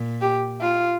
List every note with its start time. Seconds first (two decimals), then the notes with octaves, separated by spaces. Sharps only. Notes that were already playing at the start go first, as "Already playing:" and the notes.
Already playing: A#2
0.21 G4
0.61 F4